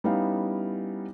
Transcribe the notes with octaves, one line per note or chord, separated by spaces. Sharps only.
G3 B3 C#4 D#4 E4 F5